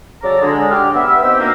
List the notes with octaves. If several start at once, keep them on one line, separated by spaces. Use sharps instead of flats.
C#3 F#3 C#4 A4 D5 A#5
D3 G#3
G4 D6 F6
B3 E5
B3 C4 D#4 G4 G5 E6
D2 A#3